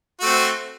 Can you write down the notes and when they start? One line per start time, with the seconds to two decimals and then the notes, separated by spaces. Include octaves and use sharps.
0.20 F#4
0.23 A3
0.25 C4